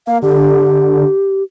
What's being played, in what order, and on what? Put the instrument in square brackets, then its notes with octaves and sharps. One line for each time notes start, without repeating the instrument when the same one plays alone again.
[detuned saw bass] A#3 [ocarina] F5
[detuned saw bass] D3 [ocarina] G4